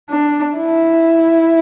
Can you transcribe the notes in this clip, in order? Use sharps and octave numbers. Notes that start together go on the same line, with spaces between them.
D4
E4